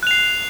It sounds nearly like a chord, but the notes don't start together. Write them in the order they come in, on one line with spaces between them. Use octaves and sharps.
F#6 F7 C7